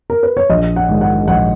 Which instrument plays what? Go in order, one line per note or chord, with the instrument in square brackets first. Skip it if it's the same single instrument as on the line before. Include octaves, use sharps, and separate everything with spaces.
[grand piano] A#4
B4
C#5
A#1 D#5
F#5
G#2 D#3
F#5
A#1 F#5